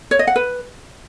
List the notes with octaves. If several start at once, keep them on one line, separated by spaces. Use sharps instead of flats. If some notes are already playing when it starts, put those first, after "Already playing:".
C#5
D#5
F#5
B4